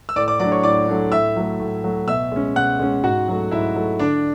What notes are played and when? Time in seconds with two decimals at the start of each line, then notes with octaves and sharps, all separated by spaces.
0.09 E6
0.16 A2 D5 D6
0.28 D5 D6
0.39 F#3 A3 D4 D5 D6
0.52 C#5 C#6
0.63 A2 D5 D6
0.88 F#3 A3 D4
1.11 A2 E5 E6
1.36 F#3 A3
1.59 A2
1.84 F#3 A3
2.08 B2 E5 E6
2.32 G#3 C#4
2.56 B2 F#5 F#6
2.79 G#3 C#4
3.03 G#2 F#4 F#5
3.28 F#3 A3
3.51 G#2 E4 E5
3.75 F#3 A3
3.99 D3 D4 D5